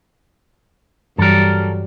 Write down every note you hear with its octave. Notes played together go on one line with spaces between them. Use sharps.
G2 E3 F#3 G3 A4 A#4